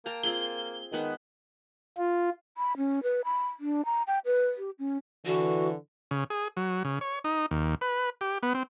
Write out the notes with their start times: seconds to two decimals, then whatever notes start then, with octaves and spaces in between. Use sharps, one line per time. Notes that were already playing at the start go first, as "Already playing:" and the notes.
0.06 A#3 G5 A5 A#5
0.23 C4 F4 G#4 G7
0.93 D#3 G#3 B3
1.98 F4
2.57 B5
2.77 C#4
3.03 B4
3.25 B5
3.60 D4
3.85 A#5
4.07 G5
4.25 B4
4.58 G4
4.79 C#4
5.26 D3 E3 F#4
6.11 C#3
6.30 G#4
6.57 F#3
6.85 C#3
7.01 C#5
7.24 D#4
7.51 D#2
7.81 B4
8.21 G4
8.43 B3
8.55 C4